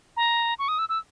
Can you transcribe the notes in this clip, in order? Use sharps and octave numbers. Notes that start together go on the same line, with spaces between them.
A#5
C#6
D#6
E6
E6